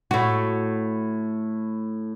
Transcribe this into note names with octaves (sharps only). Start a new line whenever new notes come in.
A2 F#4